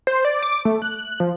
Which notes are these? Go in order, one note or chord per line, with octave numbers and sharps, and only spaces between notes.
C5
D5
D6
A3
F#6
F3